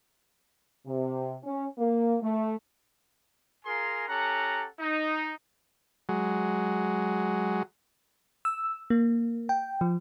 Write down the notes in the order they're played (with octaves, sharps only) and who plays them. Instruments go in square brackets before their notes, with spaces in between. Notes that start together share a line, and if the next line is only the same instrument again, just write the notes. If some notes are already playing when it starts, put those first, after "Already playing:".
[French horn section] C3
C#4
A#3
A3
[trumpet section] F4 G#4 A#4 G#5 A#5 C6
C#4 G4 A4 F#5 A#5
D#4
[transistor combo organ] F#3 G#3
[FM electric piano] E6
A#3
G5
F3